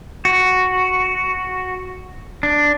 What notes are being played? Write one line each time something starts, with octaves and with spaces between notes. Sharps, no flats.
F#4
D4